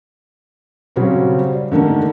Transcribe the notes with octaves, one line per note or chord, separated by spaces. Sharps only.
C#3 F#3 G3 C4 C#4
D5
D3 D#3 A3 A#3